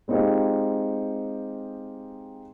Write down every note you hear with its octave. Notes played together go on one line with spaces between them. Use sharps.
G#3 C4 D#4 F4 G4